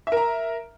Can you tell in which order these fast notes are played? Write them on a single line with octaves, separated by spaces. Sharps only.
E5 A#4 A#5